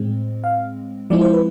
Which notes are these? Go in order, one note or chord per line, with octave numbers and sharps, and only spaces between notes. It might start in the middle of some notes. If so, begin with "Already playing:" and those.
Already playing: A2 G#3 C4
F5
F3 G#3 C4 E4 D5
C5
B4